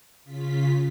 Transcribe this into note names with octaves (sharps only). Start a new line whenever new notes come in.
C#3 F4 B6